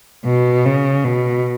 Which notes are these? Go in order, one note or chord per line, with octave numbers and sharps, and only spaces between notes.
B2
C#3
B2